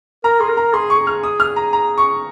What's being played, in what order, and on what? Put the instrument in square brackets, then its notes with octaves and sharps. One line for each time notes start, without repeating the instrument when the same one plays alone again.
[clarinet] A#4 [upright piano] A#5
[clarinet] G#4 [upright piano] C6
[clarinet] A#4
[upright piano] A#5
[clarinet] G#4 [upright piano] C6
[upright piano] C#6
[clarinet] G#4
[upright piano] F6
D#6
F6
A#5
A#5
C#6